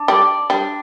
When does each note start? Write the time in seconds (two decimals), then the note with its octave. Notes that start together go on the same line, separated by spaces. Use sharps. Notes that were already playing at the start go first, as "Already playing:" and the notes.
Already playing: D4
0.08 G3 D5
0.50 G3 D4